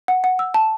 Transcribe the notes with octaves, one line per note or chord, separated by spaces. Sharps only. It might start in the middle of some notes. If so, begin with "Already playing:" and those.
F#5
F#5
E6
A5